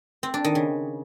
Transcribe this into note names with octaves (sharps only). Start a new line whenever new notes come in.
C4
D4
D#3
C#3